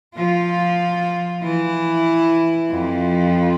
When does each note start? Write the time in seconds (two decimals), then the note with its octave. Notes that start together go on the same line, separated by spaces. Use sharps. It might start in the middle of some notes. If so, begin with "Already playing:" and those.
0.16 F3 F4
1.43 E3 E4
2.70 F2 F3